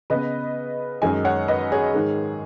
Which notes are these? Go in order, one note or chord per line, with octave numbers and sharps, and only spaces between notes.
C#3 B3 B4 D#5
F#2 D#3 G#3 D#5 G#5
C#5 F#5
B4 D#5
G#4 C#5
G#2 D#3 G#3